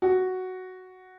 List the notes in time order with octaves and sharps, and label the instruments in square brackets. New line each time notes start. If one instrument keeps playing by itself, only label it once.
[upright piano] F#4